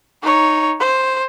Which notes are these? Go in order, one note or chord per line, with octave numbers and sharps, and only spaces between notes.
D#4 C#5
C5